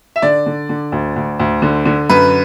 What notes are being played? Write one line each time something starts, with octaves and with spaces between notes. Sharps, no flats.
E5
D3 D5
D3
D3
D2
D2
D2
D3
D3
F#2 B4